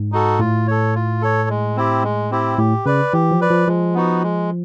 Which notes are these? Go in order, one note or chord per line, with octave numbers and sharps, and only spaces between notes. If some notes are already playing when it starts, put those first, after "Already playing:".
Already playing: G#2
D#4 F#4 A4
A2 F4
A4 C#5
F4
A4 C#5
G#3
C4 E4 G4
G#3
C4 E4 G4
A2 G4
C#3 B4 D5
E3 G4
F3
B4 D5
F3
F3 G#3
B3 D#4 F#4
G#3